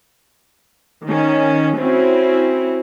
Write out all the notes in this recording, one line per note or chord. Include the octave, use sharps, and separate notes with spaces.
D#3 C#4
C4 C#4 E4 F#4